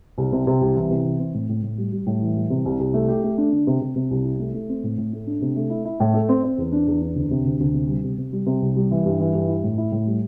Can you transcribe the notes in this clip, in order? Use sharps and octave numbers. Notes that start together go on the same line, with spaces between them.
C2
C3
C3
C2
E3
C3
E3
C4
A2
A2
A2
G3
G3
A2
E3
G3
C3
C2
C2
A3
G4
A3
D4
D3
C3
C3
C3
C2
E4
A3
A3
C4
A2
A2
A3
D4
C3
A3
E4
E4
A2
A3
C4
C4
E2
D4
E2
D4
D2
C3
D2
D2
C3
G3
C3
C3
G3
C3
C2
G3
E3
G2
E3
G2
E4
A2
E4
A2
G3